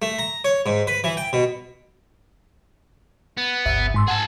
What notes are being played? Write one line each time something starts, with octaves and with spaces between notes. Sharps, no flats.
A3
A#5
C#5
G#2
B4
E3
G5
B2
B3
G1 C#2 E5
G#2 C6 E6
G#4 F#5 A5